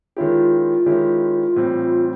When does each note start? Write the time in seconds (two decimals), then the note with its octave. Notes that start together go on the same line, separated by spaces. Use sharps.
0.16 D#3 G#3 C#4 E4 F4 G4
0.86 D#3 G#3 C#4 E4 G4
1.56 A2 E3 G3 C4 E4